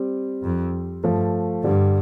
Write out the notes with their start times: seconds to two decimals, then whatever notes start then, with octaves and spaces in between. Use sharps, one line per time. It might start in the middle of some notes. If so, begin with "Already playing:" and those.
Already playing: G3 C4
0.44 F2
1.04 G2 F3 A3
1.64 G2 D3 G3